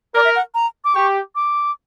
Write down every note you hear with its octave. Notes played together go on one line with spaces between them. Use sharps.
A#4 D5
E5
F#5
A#5
D6
G4 C#6
D6